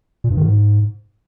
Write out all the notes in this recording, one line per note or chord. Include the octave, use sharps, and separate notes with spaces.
A#2
G2
D#3
G#2